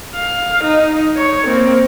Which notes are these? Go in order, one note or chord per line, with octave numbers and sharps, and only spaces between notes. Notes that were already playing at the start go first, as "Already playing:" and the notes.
F5
D#4
C#5
A#3 C4